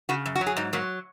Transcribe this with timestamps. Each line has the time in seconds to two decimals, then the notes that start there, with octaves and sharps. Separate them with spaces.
0.09 C#3 F#4
0.26 F#2
0.36 F#4
0.41 F#3
0.47 G#4
0.57 G#2 D#4
0.73 F#3 A#3